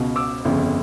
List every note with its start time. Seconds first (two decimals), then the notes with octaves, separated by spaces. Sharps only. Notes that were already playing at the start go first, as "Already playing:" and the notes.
Already playing: C#2 B2
0.16 D6 E6
0.45 G1 F2 C#3